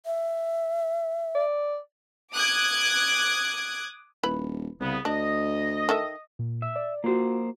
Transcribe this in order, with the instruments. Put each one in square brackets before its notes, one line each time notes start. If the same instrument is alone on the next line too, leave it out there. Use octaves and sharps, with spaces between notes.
[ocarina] E5
[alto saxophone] D5
[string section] D6 D#6 F#6 G#6
[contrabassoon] D#1 [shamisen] E4 B4 B5
[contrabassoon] C2 [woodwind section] C#3 B3
[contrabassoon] D2 [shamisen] D4 [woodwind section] D#5
[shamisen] D#3 A4 E5
[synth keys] A#2
[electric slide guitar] E5
[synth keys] D5
[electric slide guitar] A#3 C5 [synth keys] F4 F#4